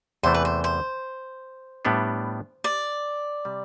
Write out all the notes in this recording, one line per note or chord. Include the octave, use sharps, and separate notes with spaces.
E2 C3 E3 A3 C5
B4
C5
C5
A2 G3 B3 D4
D5
C3 G3